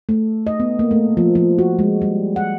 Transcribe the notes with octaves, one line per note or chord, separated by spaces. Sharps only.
A3
D#5
B3
A#3
A3
F3
F3
F#4
G#3
G3
F#5